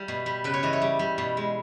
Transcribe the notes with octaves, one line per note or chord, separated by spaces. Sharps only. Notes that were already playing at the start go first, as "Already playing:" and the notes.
Already playing: G3
B2
G3
C#3 B4
C#5
E3 D#5
C#5
G3
G3
B2
G#3